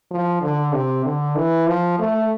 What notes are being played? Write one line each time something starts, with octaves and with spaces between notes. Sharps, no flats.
F3
D3
C3
D3
E3
F3
A3